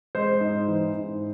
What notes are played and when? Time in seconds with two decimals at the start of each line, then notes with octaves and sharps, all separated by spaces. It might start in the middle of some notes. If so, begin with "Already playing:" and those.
0.15 G#3 C5
0.41 G#2
0.67 E3
0.94 G#2